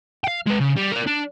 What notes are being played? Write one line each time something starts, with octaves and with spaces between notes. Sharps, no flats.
F5 G5
G#3 B4
C#3
G3
A#4 D5
D4